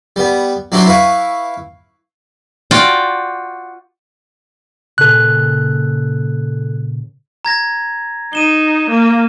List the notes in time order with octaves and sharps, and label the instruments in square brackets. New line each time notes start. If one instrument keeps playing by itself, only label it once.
[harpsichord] G3 B3
F#3 D4 E4 F#4 C5
E4 B4 F5 C#6
[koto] F4 F#4 D5 G5
[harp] A#2 C#3 [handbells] A4 F#6
[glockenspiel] A#5 G#6 A#6
[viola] D#4 [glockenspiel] D#7 E7 G7
[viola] A#3